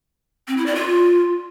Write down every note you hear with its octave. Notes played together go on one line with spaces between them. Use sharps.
C4
E4
D5
F4